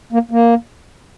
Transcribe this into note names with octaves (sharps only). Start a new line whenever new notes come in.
A#3
A#3